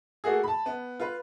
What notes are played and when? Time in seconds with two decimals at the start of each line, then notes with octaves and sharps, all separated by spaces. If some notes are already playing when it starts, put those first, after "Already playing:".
0.24 A3 A#3 F#4 G#4
0.44 A5 B5
0.66 B3
1.00 F4 B4